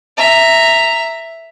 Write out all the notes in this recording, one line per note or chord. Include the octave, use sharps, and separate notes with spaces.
E5 A#5